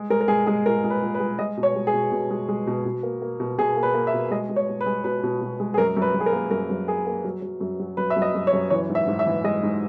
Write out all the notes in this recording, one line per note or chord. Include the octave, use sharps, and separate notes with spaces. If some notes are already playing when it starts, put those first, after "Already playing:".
Already playing: G#3
G#3 A#4
A#4
G#3 G#4
G#3 G#4
A#2 A#4
G#3
B4
A#2
B4
G#3
G#3 D#5
B2
C#5
G#3
G#4
B2
B2
G#3
G#3
B2
B2
A#3
A#3
B2
B2 G#4
A#3
B4
A#3
E5
B2
G#3 D#5
G#3
C#5
B2
B4
G#3
B2 B4
B2
B2
G#3
G#4
F#2 A#4
F#2
B4
F#2
G#4
A#4
A#3
F#2 A#4
F#2
A#3 G#4
A#3
F#3
F#3
F#2
F#3
F#2 B4
E5
F#2
D#5
F#2
C#5
F#2
E3 C#5
G#2
E5
G#2
E5
E3
G#3 D#5
G#2